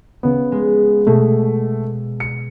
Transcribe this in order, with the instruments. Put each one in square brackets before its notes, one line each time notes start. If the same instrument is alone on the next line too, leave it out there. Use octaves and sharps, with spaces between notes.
[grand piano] C#3 B3
[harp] G#3
[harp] B2 [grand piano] A3
[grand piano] C#7